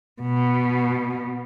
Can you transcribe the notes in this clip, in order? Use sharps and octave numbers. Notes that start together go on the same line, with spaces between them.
B2